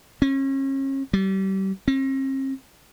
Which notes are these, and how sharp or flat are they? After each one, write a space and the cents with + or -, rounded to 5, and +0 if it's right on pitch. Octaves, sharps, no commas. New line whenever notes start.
C#4 -35
G3 -30
C4 +45